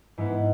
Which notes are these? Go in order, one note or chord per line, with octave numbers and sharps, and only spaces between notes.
G#2 G#3 B3 E4